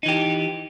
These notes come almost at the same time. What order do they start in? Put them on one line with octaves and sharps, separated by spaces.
D#4 E3 G4